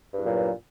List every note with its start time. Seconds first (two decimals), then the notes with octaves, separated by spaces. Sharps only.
0.12 G2
0.17 E2
0.21 F#3
0.25 A#2